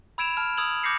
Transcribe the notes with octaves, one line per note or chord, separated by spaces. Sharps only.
B5 E6 G#6 D7 E7 F7
A5 F6
D#6 E6 G#6 F7 F#7
D6 G6 G#6 A#6 C7 C#7